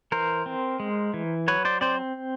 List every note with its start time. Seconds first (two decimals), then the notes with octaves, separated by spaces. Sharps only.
0.12 E3 A#4 C5
0.46 C4
0.80 G#3
1.14 E3
1.48 F#3 B4 C#5
1.65 C5 D5
1.81 C4 C5 D5